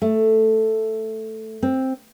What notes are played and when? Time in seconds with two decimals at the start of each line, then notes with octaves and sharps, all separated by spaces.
0.02 A3
1.63 C4